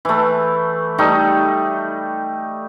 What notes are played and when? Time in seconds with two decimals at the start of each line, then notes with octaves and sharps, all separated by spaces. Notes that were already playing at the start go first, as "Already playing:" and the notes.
0.05 E3 A3
0.98 G3 A3 D#4